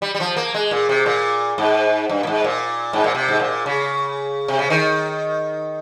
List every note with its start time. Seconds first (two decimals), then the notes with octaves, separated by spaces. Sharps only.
0.02 G3
0.15 G3
0.20 F3
0.36 A#3
0.54 G#3
0.71 A#2
0.89 C3
1.06 A#2
1.58 G#2
2.10 G2
2.23 A#2
2.27 G#2
2.44 A#2
2.93 G#2
3.04 A#2
3.14 C3
3.28 G#2
3.40 A#2
3.66 C#3
4.48 C3
4.59 C#3
4.70 D#3